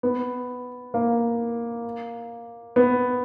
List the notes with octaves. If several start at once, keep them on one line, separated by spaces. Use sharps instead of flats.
B3
A#3
B3